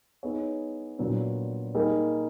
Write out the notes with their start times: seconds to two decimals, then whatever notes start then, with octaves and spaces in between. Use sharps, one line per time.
0.23 B3 D#4 G#4 C#5
0.99 A#2 F#3 B3 D4
1.75 G3 A#3 D#4 G#4